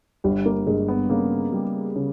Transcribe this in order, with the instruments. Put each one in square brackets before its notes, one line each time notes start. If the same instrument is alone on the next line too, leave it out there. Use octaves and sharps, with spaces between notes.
[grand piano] G1 [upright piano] G3
[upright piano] A#3
[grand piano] G2 [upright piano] G#3
[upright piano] B3
[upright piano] C#3 [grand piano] A#3
[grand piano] G3
C#3